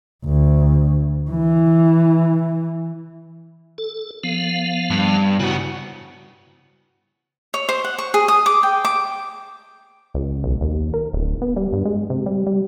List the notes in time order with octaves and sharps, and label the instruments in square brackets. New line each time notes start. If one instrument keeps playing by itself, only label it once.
[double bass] D2
E3
[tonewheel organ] A4
F3 B3 F5
[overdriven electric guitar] G2
[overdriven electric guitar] C#3 B3 [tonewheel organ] E4 F#4
[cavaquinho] C#5
C5
F#5
C#6
G#4
D#6
D6
G5
D6
[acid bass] C#2
B1
D#2
A#4
D1
B3
G3
G2
G#3
C3
G3
G3